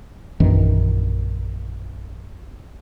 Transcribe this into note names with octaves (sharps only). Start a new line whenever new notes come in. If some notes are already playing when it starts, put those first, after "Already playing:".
A#1 F#2 D#3 E3